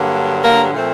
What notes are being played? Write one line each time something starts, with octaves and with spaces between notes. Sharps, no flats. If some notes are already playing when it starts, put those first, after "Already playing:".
Already playing: G2 D3 F#3 A#3
A#3 A#4
A#2 F3 A3 C4